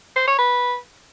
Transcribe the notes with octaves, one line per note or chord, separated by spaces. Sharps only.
C5
C#5
B4